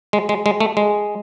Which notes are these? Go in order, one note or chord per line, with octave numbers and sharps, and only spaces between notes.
G#3
G#3
G#3
A3
G#3